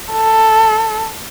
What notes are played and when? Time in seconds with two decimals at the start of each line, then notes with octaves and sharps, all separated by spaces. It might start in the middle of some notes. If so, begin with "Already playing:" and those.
0.12 A4